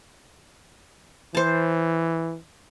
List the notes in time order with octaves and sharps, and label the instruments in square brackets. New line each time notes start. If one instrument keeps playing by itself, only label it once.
[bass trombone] E3 [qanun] C5 A5